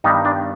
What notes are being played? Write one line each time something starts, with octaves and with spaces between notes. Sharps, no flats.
G2 D#3 G3 B3 D#4
D4